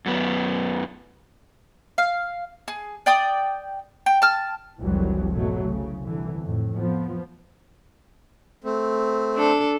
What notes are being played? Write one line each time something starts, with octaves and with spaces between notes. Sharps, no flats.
F#2 B3
F5
G#4
D5 G5 D#6
G5
A5 F6
F1 C2 E3 F#3 G3
G#2 B2 F#3 A3
C2 C#3
C2 D3 E3
F2 A2
F3 B3
A3 C4
D4 A4